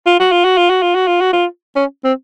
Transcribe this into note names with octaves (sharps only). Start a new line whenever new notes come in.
F4
F#4
F4
F#4
F4
F#4
F4
F#4
F4
F#4
F4
C#4
C4